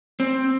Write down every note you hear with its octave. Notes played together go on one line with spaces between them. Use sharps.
C4